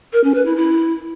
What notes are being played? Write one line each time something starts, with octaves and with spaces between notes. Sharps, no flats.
A#4
C#4
B4
E4
E4